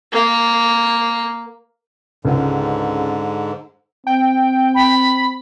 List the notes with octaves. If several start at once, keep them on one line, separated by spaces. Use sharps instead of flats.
A#3
C#2 G#2 D3
C4 G5
B5